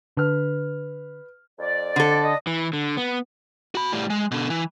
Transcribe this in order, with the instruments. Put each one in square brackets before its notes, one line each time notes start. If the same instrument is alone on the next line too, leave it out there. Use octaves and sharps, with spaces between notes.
[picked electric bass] D3 [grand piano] B4 F6
[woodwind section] F2 D5
[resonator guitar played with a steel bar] D3 A4
[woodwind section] D5 D#5
[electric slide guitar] E3
D3
B3
[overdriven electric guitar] F#4 B5
A2 G3
G#3
B2 D3
E3